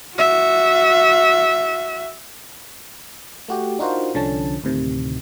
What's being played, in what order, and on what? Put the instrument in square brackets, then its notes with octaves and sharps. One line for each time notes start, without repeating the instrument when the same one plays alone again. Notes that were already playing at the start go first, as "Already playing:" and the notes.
[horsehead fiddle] F#4 E5
[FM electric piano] A3 F#4 G4
D4 D#4 F4 F#4 A#4 C5
C2 D3 F3 C#4 A5
D2 A2 C3 D#3